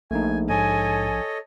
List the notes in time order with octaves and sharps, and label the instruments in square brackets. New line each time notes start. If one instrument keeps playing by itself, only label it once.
[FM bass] A#1 [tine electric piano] A3 A#3 D#4 [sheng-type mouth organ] G#5
[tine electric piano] G#2 [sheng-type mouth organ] A4 C#5 D#5 [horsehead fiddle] G#5